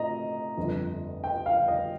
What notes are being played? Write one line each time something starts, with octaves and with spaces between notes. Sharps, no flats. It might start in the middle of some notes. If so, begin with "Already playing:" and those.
Already playing: A2 F3 A3 C4 D#5 A#5
G1 F2 D3
G5
F5
D#5